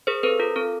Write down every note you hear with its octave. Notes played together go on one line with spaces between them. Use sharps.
G#4 A#4 C5
C4 A4 B4
F4 A#4
C4 A4